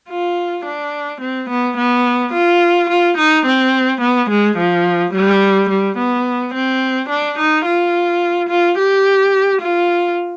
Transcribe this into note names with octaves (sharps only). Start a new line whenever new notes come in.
F4
D4
C4
B3
B3
F4
F4
D#4
C4
B3
G#3
F3
G3
G3
B3
C4
D4
D#4
F4
F4
G4
F4